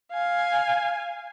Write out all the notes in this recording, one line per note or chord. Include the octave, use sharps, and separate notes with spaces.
F5 G#5